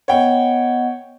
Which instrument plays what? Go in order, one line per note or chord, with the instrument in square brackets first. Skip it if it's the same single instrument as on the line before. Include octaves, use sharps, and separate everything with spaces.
[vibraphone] B3 D#5 F#5 [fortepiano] C#5 G5